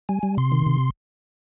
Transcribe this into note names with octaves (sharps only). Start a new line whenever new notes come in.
G3 G#5
G3
C3 C6
D#3
C3